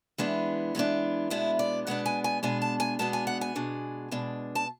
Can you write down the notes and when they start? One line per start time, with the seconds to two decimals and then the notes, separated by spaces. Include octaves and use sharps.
0.18 E3 G#3 B3 D4
0.75 E3 G#3 B3 D4
1.30 B2 G#3 B3 D4 E4
1.59 D5
1.87 B2 G#3 B3 D4 F#5
2.06 G#5
2.24 G#5
2.43 B2 G#3 B3 D4 G#5
2.62 A5
2.80 G#5
2.99 B2 G#3 B3 D4 A5
3.13 G#5
3.27 F#5
3.41 G#5
3.55 B2 G#3 D4
4.12 B2 G#3 D4
4.55 A5